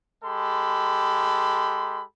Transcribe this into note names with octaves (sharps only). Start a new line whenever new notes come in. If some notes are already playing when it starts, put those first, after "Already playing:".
G#3 G4 A4 B5 C6